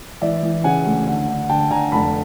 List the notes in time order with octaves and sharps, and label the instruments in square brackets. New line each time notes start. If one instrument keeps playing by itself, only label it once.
[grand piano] E3 D5 E5
E3
C#3 F#5 G#5
D2
D3
D3
D3 G5 A5
D3 G#5 A#5
F1 A5 B5